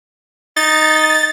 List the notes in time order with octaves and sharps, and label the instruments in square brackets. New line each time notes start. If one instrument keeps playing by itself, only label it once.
[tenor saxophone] D#4 [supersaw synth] A6